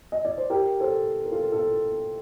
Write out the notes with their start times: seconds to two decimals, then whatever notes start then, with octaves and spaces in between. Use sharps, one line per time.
0.12 D#5
0.25 D5
0.38 C5
0.50 G4 A#4
0.80 A4 C5
1.25 A#4
1.31 F4 A4
1.52 F4 A4